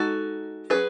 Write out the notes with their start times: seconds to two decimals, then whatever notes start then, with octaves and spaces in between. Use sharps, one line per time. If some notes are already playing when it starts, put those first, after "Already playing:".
Already playing: G#3 D#4 F#4 A4
0.70 F#3 C#4 G#4 B4